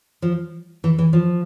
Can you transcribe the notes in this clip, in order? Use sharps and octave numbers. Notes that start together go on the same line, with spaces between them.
F3
E3
E3
F3